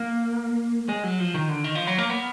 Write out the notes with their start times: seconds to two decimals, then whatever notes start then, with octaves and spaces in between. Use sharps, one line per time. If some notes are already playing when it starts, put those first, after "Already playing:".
Already playing: A#3
0.89 G#3
1.04 F#3
1.20 F3
1.34 D#3
1.49 D3
1.64 D#3
1.75 F3
1.87 F#3
1.98 A#3
2.10 B3